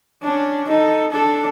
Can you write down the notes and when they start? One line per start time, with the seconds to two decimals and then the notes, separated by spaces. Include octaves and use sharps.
0.23 C#4 D4
0.68 D#4 A4
1.12 D4 A4